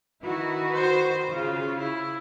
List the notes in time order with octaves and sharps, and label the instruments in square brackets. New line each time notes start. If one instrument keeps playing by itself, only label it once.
[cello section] D#3 F#4 B4 [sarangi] E4
[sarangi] C5
[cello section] C#3 [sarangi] F4
[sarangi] E4